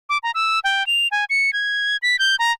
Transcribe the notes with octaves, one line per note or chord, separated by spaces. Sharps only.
D6
A#5
E6
G5
F7
G#5
C#7
G#6
B6
G6
A#5